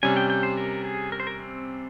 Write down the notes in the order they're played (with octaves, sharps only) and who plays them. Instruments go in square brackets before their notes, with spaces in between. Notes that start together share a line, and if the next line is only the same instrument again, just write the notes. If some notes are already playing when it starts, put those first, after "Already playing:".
[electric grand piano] C3 G3 C#4 [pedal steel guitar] G#5
[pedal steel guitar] G5
G5
C5
A#4
G#4
A#4
C5
A#4
C4